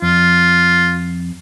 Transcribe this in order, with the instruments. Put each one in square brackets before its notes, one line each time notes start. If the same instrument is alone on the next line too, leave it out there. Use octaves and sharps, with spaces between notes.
[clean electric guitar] F2 [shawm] F4